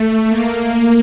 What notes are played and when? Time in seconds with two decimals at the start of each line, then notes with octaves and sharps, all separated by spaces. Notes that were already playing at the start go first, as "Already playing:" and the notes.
Already playing: A3
0.30 A#3